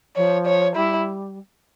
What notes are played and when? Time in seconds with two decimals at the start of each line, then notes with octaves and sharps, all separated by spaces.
0.16 F3 C#5
0.46 C#5
0.76 G3 E4